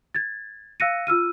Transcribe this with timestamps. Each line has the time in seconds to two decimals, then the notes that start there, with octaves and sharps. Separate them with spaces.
0.15 G#6 A6
0.80 F5 E6 F#6 A#6 C#7 D#7
1.07 F4 E6 F6 D#7